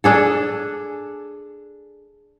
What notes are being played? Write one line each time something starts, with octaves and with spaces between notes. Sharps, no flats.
D4 G#4 A4